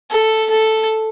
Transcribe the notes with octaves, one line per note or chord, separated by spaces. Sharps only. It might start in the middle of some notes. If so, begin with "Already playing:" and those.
A4
A4